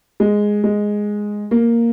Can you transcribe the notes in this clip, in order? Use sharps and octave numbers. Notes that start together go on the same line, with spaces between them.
G#3
G#3
A#3